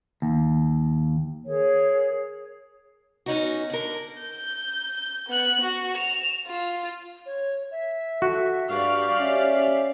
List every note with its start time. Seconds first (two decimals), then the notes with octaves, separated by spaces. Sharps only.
0.22 D#2
1.45 G#4 A#4 C#5
3.26 B3 C#4 D#4 F#4
3.70 D3 A#4
4.20 G6
5.28 B3 F#6
5.61 F#4
5.94 E7 F7
6.48 F4
7.26 C#5
7.71 E5
8.22 F#4 A4
8.69 G2 G4 D5 F5 C#6
9.21 C#4 E5